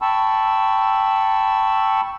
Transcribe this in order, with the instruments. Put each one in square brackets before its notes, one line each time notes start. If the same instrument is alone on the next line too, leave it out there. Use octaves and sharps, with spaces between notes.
[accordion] G5 A5 B5 C#6 E6